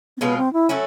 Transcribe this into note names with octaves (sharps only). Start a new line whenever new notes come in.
C4
B2 G#3 B3 C#4 F4
C4
E4
F#3 A3 C#4 E4